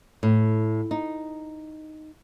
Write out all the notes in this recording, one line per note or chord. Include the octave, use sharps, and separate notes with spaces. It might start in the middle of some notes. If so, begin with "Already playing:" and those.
A2
D#4